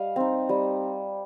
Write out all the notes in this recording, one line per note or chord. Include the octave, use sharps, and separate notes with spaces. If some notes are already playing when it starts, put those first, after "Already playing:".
Already playing: G3 D#5 F5
C4 D#4
G3